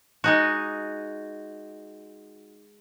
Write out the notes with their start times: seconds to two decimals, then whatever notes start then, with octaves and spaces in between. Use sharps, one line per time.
0.24 G#3 D#4 F#4